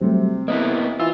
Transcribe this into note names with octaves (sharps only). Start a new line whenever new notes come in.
C3 F#3 G3 A3
A#3 B3 E4 D#5
E3 F4 E6